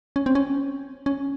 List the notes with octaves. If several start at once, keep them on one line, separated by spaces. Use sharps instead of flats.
C#4
C4
C#4
C#4